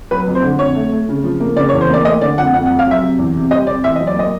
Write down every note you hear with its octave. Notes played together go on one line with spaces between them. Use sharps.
F#3 B4
F2
C5
D3
F2 C#5
A3
A3
C#3
F3
A#3
C#3 D5
C#5
E2
C5
A#3 D5
A3 D#5
D3 D5
F2 F#5
F2 F#5
F#5
F2
F5
F#3 E5
C3
E2
C3
G3 D#5
C3 D5
E2 E5
F#3 D#5
D5
A#3 D#5